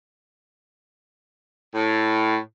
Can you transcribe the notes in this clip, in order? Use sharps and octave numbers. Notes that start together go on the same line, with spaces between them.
A2